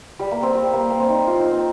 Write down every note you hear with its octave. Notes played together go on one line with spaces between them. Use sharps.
G3
A#3
C4
G3
A#3
A#3
C4
D#4
F4
D#4
C4